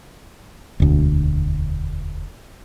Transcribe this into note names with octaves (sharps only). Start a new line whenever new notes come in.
E1 D2